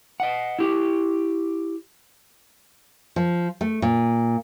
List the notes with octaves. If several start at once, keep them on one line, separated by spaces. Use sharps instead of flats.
D#5 F#5
E4 G4
F3
A3
A#2